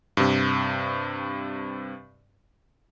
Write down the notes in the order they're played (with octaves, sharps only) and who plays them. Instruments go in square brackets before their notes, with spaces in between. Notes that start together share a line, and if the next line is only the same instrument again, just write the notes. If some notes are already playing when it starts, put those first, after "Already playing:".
[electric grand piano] G2 C3